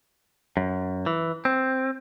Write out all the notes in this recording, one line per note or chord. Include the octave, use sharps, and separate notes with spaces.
F#2
E3
C4